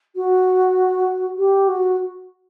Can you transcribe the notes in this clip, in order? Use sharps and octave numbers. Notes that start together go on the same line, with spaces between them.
F#4
G4
F#4